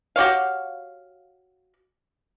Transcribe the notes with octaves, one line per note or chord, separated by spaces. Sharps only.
F#4 G4 C#5 F5